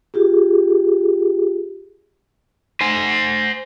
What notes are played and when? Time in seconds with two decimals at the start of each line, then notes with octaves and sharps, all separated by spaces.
0.14 F4 G4 G#4
2.81 C5 G#5